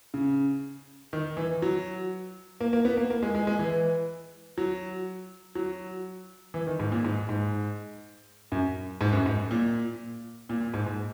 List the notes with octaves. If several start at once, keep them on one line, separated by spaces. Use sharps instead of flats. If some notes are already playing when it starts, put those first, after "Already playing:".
C#3
D#3
E3
F#3
A#3
A#3
B3
A#3
A#3
G#3
G#3
G#3
E3
F#3
F#3
E3
D#3
G#2
A#2
G#2
G#2
F#2
G#2
F#2
G#2
A#2
A#2
A#2
G#2
G#2